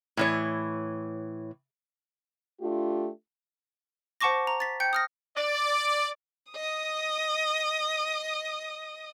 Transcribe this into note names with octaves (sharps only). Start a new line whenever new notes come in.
A2 E3 C#5
A3 D4 F4 G4
C5 F#5 A5 C#6 D6 A#6
A#5
A6 B6
G5 G6 C#7
D#6 F6 A#6
D5
D#5 D#6